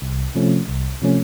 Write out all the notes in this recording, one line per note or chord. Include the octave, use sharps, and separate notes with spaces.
C2
C3 F3 A3 C#4
C2
C3 F3 A3 C#4